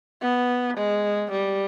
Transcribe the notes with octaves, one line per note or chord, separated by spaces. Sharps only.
B3
G#3
G3